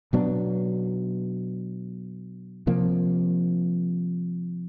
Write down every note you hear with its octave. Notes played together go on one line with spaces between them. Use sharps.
B2 F#3 B3 D4
C3 F3 A#3